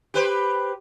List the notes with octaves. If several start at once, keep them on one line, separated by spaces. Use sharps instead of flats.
G4 B4 C5